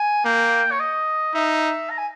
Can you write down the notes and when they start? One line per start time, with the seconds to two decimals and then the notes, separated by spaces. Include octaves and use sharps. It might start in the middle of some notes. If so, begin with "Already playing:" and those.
Already playing: G#5
0.25 A#3 G5
0.72 C#5
0.80 D#5
1.34 D#4 E5
1.90 A#5
1.98 G#5